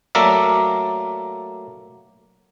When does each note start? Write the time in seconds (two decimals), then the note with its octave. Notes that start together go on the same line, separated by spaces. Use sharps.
0.15 F#3 A3 A#3 A#4 D5 E5